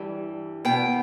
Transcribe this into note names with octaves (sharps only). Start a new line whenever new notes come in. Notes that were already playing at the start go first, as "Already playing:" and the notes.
Already playing: G2 E3 G3
B2 B3 G5